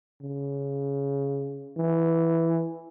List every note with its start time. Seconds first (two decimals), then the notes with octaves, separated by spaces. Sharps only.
0.21 C#3
1.77 E3